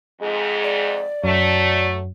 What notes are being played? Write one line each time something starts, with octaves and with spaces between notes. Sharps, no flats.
F2 G#2 G#3
D5
F#2 F#3 A3